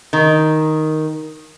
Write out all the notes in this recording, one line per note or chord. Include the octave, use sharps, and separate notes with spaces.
D#3